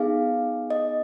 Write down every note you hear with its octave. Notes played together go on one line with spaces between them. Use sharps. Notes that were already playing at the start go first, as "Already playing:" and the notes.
Already playing: B3 D#4 G#4 F5
D#5